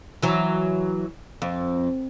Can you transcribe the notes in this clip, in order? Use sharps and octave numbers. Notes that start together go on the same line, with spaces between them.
E3 F#3
F2